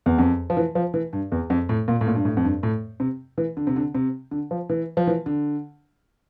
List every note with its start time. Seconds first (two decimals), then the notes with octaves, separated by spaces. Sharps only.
0.06 E2
0.18 F2
0.50 F3
0.57 E3
0.75 F3
0.94 E3
1.13 G2
1.32 E2
1.50 F2
1.69 A2
1.88 A#2
2.01 A2
2.07 A#2
2.16 G2
2.25 A2
2.37 F2
2.44 G2
2.63 A2
3.00 C3
3.38 E3
3.57 D3
3.67 C3
3.76 D3
3.95 C3
4.31 D3
4.51 F3
4.69 E3
4.97 F3
5.07 E3
5.26 D3